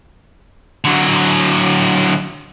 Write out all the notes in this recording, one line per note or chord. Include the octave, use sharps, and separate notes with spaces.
D3 F#3